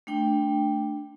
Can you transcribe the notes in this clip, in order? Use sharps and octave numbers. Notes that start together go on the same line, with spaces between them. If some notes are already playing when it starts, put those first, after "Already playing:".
A3 D4 G5